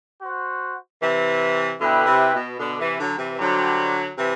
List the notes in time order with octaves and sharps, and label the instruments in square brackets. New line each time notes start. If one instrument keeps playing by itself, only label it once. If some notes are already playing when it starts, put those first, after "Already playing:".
[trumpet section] F#4 C5 F#5
[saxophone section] C3 E3
[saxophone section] B2 D3 [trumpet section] E4 B4 E5 G5
[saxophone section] C3
B2
B2 D3
C3 E3
D3 F#3
C3 E3
[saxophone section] D3 F#3 [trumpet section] G3 D4 G4 C5
[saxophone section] C3 E3